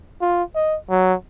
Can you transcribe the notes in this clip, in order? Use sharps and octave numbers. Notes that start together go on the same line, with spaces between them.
F4
D#5
F#3